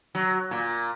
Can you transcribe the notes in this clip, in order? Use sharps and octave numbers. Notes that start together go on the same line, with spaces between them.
F#3
A#2